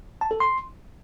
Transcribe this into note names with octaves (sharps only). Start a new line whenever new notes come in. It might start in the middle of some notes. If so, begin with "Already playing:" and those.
A5
A4
C6